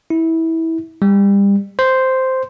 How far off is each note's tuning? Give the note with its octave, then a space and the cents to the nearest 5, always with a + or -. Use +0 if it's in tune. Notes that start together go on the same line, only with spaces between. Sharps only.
E4 -20
G3 +30
C5 -5